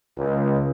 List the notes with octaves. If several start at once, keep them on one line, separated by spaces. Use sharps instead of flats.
C#2